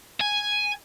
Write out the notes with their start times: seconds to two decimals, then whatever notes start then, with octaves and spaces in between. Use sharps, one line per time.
0.21 G#5